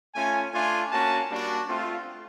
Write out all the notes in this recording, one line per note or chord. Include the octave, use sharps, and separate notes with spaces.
A3 C#4 F4 G#5
A3 D4 F4 G#5
A#3 C#4 F#4 A5
G3 A#3 D4 F#4
A3 C4 F4